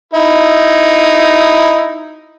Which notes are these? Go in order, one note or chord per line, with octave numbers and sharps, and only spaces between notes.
D#4 E4